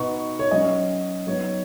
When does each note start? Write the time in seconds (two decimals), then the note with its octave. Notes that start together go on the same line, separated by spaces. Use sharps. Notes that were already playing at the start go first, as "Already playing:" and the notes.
Already playing: B2 B3 D#4 C#6
0.39 C#5
0.51 F#3 C#4 D#5
1.27 F#3 B3 D#4 C#5